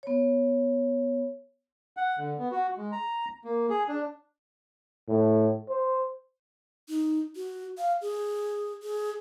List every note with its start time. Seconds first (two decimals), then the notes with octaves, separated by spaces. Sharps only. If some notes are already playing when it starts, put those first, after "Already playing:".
0.03 B3 C#5
1.97 F#5
2.18 D3
2.38 B3
2.51 F#4
2.77 G#3
2.92 A#5
3.44 A#3
3.70 G#4
3.88 D4
5.08 A2
5.69 C5
6.89 D#4
7.36 F#4
7.78 F5
8.02 G#4
8.83 G#4